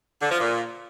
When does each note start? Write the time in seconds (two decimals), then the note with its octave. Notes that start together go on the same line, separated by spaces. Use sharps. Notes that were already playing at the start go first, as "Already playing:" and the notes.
0.22 D3
0.31 F3
0.40 A#2